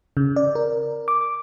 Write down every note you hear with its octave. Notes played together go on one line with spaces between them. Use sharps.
C#3
D5
A#4
D6